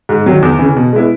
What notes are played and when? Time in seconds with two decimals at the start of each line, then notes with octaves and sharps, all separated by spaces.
0.09 G#2
0.26 D#3 F#3
0.42 E2
0.59 C#3 E3
0.76 B2
0.92 G#3 B3 E4